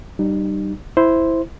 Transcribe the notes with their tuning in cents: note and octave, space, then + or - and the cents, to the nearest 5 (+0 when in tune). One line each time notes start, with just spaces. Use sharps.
G3 -20 D#4 -45
E4 +0 C5 -5